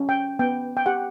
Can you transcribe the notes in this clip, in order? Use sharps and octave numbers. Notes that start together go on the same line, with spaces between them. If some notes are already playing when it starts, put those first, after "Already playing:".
Already playing: C#4
G5
B3 G5
G5
G4 F#5